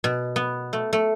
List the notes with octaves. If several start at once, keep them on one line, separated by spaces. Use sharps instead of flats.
B2
B3
A3
A3